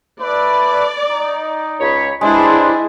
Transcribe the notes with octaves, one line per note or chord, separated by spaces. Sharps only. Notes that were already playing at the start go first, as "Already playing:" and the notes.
A3 E4 B4 D5
D#4
C#2 C#5 B5
G#3 D4 E4 G4 G#4 B4 C5